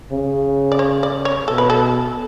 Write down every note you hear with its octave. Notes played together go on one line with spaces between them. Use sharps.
C#3
D5
C#5
D5
C#5
B2 A4
B4
A4